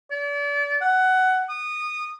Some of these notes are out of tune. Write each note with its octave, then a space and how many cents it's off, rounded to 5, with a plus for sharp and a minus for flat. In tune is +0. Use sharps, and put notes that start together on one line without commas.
D5 -35
F#5 +15
D#6 -20